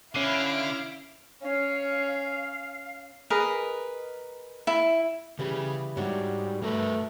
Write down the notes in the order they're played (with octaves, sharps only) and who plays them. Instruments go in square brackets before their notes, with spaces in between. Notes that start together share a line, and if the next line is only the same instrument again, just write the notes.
[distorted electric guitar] D3 [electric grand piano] C#4 C7 D#7 [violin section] E4 F5 D7
[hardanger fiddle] C#4 [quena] F5
[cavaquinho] G#4 A#4 B4 D#5
E4
[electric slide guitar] C#3 G#4 [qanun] E3 G3 B4
[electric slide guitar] G#2 [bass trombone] G3 [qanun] D4 F#4 C#5
[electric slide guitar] G2 A#4 B4 [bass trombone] A3